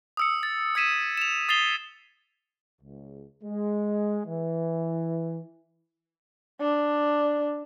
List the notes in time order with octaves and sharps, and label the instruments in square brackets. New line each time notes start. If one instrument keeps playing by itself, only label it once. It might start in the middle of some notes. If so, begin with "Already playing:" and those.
[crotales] D#6 E6 C#7
A6
E6 G#6 B6 D#7 E7
E7 F7
D#6 A6 C7 F7 G7
[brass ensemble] C#2
G#3
E3
[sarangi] D4